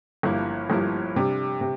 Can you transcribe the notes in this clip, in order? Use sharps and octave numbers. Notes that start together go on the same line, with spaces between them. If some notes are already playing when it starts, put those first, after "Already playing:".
G1 G2 F3 A#3 E4
G1 G2 F3 A#3 E4
C3 G3 D4
C3